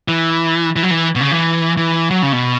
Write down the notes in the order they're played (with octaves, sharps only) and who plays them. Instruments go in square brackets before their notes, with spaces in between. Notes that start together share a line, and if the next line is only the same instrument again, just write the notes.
[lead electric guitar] E3
E3
F#3
E3
B2
C#3
E3
E3
F#3
C#3
B2